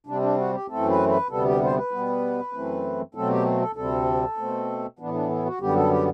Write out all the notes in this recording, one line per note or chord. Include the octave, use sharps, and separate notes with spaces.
C3 G3 C4 D4
D4
F#4
G4
F#2 E3 A3 C4 A4
B4
B4
D2 C3 G3 B3 A4
G4
C5
B4
B2 G3 B3
F#2 E3 A3 C4
B2 F#3 A3 C4 A4
G4
A4
D2 C3 G3 C4 A4
B2 A3 C4
A2 E3 B3 D4
D4
E4
F#4
F#2 D3 G3 B3 G4
A4
G4